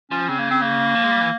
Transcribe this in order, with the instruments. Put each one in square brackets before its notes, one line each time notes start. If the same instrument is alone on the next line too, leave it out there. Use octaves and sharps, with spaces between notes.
[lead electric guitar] F3 [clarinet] C#4
[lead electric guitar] C#3 [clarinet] C4
[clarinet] A#3
C4
A#3
[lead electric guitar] F3
G#3
G3
E3